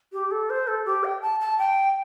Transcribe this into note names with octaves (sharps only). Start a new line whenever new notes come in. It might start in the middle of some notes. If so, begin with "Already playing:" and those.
G4
A4
C5
A4
G4
G5
A5
A5
G5